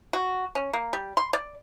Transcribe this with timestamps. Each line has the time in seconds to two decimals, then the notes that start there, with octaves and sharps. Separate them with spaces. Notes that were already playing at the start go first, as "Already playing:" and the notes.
0.13 F#4
0.55 C#4
0.73 A#3
0.93 G3
1.17 C6
1.33 D5